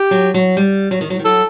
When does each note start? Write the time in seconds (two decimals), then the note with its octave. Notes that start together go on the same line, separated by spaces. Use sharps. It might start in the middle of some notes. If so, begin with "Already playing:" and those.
Already playing: G4
0.11 F#3
0.34 F#3
0.57 G3
0.91 F#3
1.01 D#3
1.10 F#3
1.19 D#3
1.25 F#3 A4